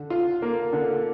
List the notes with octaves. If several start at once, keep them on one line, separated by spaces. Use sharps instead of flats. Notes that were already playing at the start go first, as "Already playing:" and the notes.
Already playing: D3
F4
A#3
D3